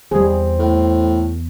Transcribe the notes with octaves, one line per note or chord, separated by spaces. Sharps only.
E2 G3 C4 G#4
A2